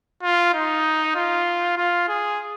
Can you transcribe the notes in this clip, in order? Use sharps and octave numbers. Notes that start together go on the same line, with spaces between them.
F4
D#4
F4
F4
G#4